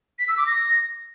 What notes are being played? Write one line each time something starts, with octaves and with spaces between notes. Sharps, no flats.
B6
E6
D6
A#6